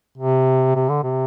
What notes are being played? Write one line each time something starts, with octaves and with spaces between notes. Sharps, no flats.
C3
C3
D3
C3